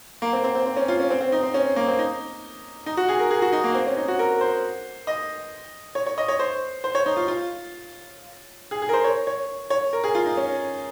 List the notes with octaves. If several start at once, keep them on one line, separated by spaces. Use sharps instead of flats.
A#3
C4
C4
C4
C4
C#4
F4
C#4
C4
C4
D#4
C4
C#4
A#3
C4
D#4
D#4
F#4
G#4
A#4
G#4
F#4
D#4
A#3
C4
C#4
D#4
F#4
A#4
C5
D#5
C#5
C#5
D#5
C#5
C5
C5
C#5
D#4
F4
F4
G#4
G#4
A#4
C5
C#5
C#5
C#5
A#4
G#4
F4
D#4
C#4